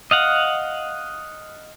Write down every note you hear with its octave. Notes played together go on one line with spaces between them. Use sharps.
D#5 F5 F#5